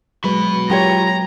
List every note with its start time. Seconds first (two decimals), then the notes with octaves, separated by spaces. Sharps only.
0.24 F#3 G#3 F#4 B4 B5
0.70 F#3 F4 G4 C#5 A#5